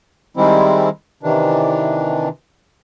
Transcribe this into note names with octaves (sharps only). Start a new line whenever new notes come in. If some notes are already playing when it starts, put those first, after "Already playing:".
D#3 G3 G#3 C4 E4
C3 D#3 E3 D4